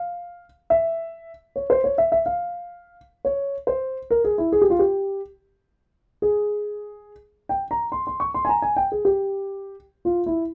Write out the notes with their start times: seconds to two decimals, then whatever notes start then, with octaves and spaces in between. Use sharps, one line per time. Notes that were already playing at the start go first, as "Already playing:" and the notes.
Already playing: F5
0.70 E5
1.56 C#5
1.70 C5
1.84 C#5
1.98 E5
2.12 E5
2.26 F5
3.25 C#5
3.67 C5
4.11 A#4
4.24 G#4
4.38 E4
4.52 G#4
4.61 G4
4.70 F4
4.79 G4
6.22 G#4
7.49 G5
7.71 A#5
7.92 C6
8.07 C6
8.20 C#6
8.34 C6
8.45 G#5
8.49 A#5
8.62 G#5
8.77 G5
8.92 G#4
9.05 G4
10.05 F4
10.26 E4